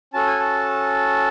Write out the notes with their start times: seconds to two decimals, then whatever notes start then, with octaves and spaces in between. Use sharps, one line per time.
0.13 C#4 F#4 A4 A5
0.27 G#5
0.40 A5